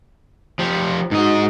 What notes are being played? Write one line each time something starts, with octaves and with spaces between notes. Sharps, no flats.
F3 G4
G#2 D#4 F#4 D#5